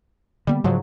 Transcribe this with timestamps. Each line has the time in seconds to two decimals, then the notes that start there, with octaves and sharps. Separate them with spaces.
0.47 D3 G3 A#3 B3
0.64 G#2 C#3 F3 F#3